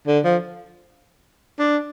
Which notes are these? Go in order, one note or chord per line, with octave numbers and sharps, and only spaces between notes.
D3
F3
D4